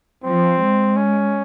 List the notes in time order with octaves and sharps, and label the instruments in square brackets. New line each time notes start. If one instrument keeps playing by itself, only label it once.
[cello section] F3 [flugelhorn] C4
[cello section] G#3
[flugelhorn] C#4